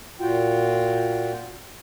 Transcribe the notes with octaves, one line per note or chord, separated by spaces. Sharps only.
A#2 F4 F#4 G5